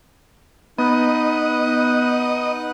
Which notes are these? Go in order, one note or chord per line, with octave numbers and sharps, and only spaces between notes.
B3 D#4 B4 D#5 F#5
D#4